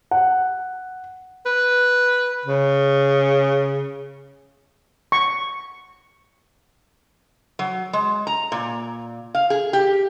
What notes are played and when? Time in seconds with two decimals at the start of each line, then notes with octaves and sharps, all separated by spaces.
0.11 F#5
1.46 B4
2.45 C#3
5.12 C#6
7.59 F#3
7.93 G#3
8.27 A#5
8.52 A#2
9.35 F5
9.50 G#4
9.73 G4